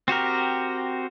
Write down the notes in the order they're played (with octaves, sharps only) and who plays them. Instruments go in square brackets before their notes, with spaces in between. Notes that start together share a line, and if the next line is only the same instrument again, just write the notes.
[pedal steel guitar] C4 F#4 G4 A#4